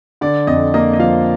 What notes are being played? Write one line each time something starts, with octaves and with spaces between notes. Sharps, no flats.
D3 D5
F2 D#5
A#3 D#5
D#5
F3 F5